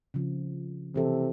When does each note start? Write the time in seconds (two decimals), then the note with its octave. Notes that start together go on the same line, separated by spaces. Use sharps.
0.14 C#3 F3
0.96 C3 E3 A4